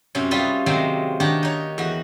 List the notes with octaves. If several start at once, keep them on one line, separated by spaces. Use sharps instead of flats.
F#2 C3 C#4
G3 F4 G#4 B4 E5
C3 D#3 F#3 G#3 A#3 C4
D#3 D4 G4 C#5 F#5 A#5
D#4 C#5
E2 F#4